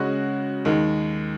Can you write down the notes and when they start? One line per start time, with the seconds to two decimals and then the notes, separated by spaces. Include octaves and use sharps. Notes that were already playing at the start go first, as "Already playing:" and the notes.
Already playing: C#3 G#3 C#4 F#4
0.65 D#2 D#3 G#3